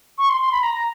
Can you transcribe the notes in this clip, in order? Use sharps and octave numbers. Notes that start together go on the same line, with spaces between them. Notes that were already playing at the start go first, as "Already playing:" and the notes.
C#6
C6
C6
B5
A#5
A#5